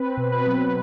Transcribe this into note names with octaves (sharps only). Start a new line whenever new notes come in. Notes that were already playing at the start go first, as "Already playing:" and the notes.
Already playing: C4 B4
B2
B4
F#3